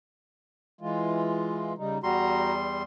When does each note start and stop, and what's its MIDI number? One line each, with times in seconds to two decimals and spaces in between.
0.81 1.73 52
0.81 1.73 56
0.81 1.73 65
1.78 1.98 49
1.78 1.98 55
1.78 1.98 63
2.03 2.83 40
2.03 2.83 55
2.03 2.53 66
2.03 2.53 82
2.03 2.83 84